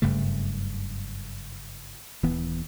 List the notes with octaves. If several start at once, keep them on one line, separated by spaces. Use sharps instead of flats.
F#1 G2 C#3 A3
D#1 E3 B3